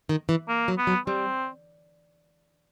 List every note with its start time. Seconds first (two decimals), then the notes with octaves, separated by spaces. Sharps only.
0.09 D#3
0.29 E3
0.48 A#3
0.68 F#3
0.78 B3
0.87 F#3
1.07 G3 C4